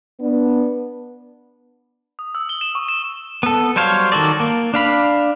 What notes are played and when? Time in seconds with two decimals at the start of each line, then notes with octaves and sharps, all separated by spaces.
0.20 B3 D4
2.19 D#6
2.35 E6
2.49 G7
2.61 E7
2.75 C#6
2.89 E7
3.43 B3 A4
3.76 F#3 G3 C5 C#5 F5
4.12 D#3 F#4 A4 D5
4.40 A#3
4.74 D4 F5 B5